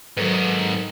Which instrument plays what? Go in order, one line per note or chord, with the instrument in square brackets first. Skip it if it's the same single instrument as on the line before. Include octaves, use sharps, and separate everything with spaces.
[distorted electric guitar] G#2 D#3 [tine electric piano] F#3 A4 B4